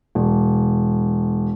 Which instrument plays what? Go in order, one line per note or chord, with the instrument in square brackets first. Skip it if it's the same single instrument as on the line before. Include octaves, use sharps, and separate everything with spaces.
[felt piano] E1